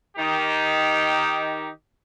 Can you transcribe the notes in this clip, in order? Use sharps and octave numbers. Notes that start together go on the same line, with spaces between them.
D#3 D#4 G4